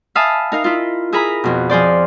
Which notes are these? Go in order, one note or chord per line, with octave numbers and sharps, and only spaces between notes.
E5 F5 G#5 A5 B5 D#6
D#4 A#4 F5
E4 F4
E4 G#4 A#4 A#5 B5
F2 B2
F3 G#4 C5 D5